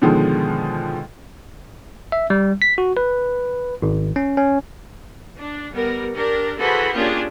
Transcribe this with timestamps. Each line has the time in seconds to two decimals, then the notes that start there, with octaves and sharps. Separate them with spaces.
0.02 B2 D3 D#3 F3 G#3
2.12 E5
2.30 G3
2.62 B6
2.78 F#4
2.97 B4
3.82 G#1
4.16 C#4
4.37 C#4
5.37 D4
5.71 G3 B3 A#4
6.13 D4 G4 A#4
6.57 E3 F#4 G#4 A4 C5 B5
6.92 A#3 C#4 D4 F4 G4 G#4